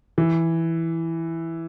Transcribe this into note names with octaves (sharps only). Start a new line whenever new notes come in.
E3